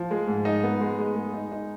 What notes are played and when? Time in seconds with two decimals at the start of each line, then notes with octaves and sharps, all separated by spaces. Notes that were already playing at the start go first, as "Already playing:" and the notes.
Already playing: F3
0.11 G#3
0.27 G#2
0.45 D#4
0.63 B3
0.81 G#3
0.99 G#3
1.16 G#3
1.34 D#4
1.52 D#4